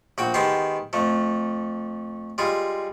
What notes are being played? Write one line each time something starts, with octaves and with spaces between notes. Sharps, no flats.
A#1 F#4 G5
D#3 G#3 B3 G4 G5 C6
F2 A3
G3 G#3 F4